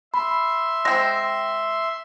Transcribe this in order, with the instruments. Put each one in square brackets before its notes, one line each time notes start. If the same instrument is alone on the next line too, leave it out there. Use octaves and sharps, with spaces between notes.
[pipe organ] E5 C6 [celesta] B5
[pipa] G#3 C4 [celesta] A#6